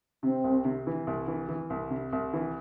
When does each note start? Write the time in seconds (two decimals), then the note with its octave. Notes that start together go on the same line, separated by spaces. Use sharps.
0.23 C3 C4
0.44 C2
0.65 C3
0.87 E3
1.07 C2
1.28 E3
1.49 E3
1.70 C2
1.90 C3
2.13 C2
2.33 E3